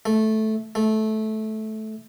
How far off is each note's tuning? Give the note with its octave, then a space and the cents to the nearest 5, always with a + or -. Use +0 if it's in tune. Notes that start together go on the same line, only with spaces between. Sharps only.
A3 -10
A3 -15